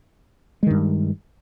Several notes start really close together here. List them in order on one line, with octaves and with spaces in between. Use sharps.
G#3 D#3 G2